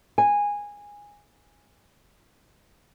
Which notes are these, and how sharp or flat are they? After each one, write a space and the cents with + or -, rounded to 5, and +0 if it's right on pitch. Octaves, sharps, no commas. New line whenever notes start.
G#5 -15